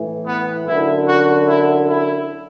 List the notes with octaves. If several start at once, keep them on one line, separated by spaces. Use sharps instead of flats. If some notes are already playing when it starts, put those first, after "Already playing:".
Already playing: A2 E3
B3
F#2 D3 E4
F#4
E4
E4